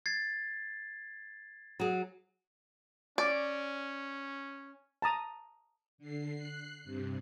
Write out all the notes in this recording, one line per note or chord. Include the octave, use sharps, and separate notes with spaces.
G#6 A6 C7
F#3 G#4
C#4 D5
A5 A#5 D#6
D3 C7
F#6 C7
G2 C3